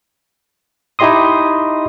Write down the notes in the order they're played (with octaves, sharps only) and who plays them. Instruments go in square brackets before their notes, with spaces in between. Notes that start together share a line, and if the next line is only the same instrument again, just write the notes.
[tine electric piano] D#4 E4 G4 D#5 C6 D#6